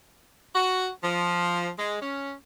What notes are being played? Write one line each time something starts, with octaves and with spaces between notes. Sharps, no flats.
F#4
F3
G#3
C#4